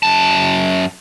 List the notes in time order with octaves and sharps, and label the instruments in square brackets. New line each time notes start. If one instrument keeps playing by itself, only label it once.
[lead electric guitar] F#2 A5